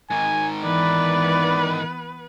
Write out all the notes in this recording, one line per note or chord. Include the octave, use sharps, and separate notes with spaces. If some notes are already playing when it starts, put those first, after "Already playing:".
G#2 D#3 G#5
E3 B3 B4 D5